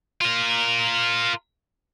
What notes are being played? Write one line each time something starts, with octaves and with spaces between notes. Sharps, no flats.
F4 A#4